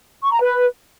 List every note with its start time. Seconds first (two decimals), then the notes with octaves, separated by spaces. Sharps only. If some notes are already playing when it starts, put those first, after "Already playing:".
0.23 C#6
0.32 A#5
0.41 B4